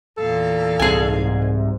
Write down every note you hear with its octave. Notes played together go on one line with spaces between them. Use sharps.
E2 A#2 A4 F5
C2 G#2 G#4 G#5